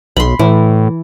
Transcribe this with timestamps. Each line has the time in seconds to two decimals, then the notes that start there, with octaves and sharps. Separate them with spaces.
0.17 B1 B5 C6
0.39 A2 E3